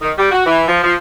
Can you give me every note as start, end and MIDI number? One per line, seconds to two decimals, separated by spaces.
0.02 0.11 51
0.18 0.29 55
0.31 0.45 66
0.46 0.64 52
0.68 0.80 53
0.84 0.93 53